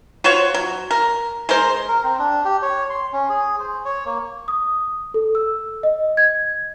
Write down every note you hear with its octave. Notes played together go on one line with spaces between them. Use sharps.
F4 F#4 C5 C#5
F#3
A#4
G#3 A#4 C5
A#4
C4
D4
G4
C#5
C6
C#4
G#4
C5
C#5
A#3
D#6
A4
E6
D#5
G#6